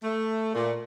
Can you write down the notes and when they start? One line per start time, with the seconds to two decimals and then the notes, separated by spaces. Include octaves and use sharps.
0.04 A3
0.54 A#2